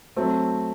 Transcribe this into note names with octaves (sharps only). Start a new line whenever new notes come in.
F#3 A3 C4